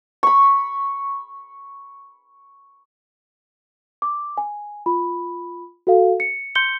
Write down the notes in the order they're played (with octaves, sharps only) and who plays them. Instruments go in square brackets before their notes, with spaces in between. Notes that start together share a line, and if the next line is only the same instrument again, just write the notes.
[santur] B5 C#6
[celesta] D6
G#5
F4 B5
F#4 A4 F5
C#7
C6 G6 C#7 G7